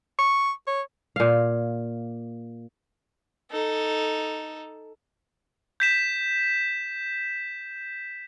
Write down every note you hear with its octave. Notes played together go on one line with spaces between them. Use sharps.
C#6
C#5
A#2 F5
D#4 A4
G6 B6 E7